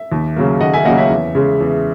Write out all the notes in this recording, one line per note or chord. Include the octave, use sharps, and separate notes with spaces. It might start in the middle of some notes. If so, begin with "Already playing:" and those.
Already playing: E5
D#2
C#3 F#3 A#3
D#2 D#5 F#5
E5 G#5
C#3 F#3 A#3 D#5 F#5
C#5 E5
E2
C#3 G#3
E2